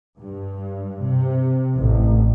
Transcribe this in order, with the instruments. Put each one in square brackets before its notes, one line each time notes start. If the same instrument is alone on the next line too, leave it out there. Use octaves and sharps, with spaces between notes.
[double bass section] G2
C3
A1